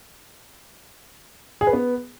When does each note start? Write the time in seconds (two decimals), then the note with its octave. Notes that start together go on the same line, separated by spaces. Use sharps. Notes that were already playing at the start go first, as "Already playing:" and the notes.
1.61 G#4
1.67 B4
1.73 B3